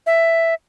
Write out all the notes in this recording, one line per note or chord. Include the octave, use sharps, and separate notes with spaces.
E5